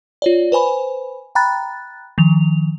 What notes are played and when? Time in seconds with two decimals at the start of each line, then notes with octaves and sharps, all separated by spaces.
0.22 F4 C#5 D5
0.52 B4 C5 G#5 B5
1.35 G5 A#5 B5 F#6 A6
2.18 D#3 F3 F7